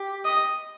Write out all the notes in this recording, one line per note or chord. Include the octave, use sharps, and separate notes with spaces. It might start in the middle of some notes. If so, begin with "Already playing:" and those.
Already playing: G4
D#5